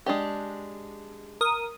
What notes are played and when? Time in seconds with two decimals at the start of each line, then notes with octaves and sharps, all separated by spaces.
0.06 G#3 D4 G4
1.41 A#4 D#6